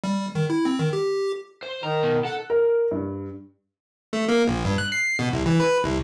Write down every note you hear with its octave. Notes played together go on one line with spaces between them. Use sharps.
G3
D#3
E4
C4
D#3
G4
C5
D#3 A#5
B2
A4 F#5
A#4
G2
A3
A#3
A#1
G2
F#6
C7
B2
C2
E3
B4
C2